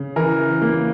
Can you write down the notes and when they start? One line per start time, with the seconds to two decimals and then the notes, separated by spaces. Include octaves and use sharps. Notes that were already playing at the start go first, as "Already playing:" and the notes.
Already playing: C#3
0.16 E3 A#4
0.62 A#3